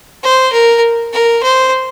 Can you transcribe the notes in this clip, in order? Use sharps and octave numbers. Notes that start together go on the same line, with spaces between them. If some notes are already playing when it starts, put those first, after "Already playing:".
C5
A#4
A#4
C5